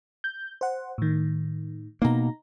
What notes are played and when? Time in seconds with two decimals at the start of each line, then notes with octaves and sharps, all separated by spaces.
0.24 G6
0.61 C5 F#5
0.98 A2 D#3
2.02 B2 A#3 D#4 A#5